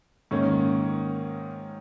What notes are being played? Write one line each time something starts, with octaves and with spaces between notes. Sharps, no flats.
G#2 D#3 A#3 C#4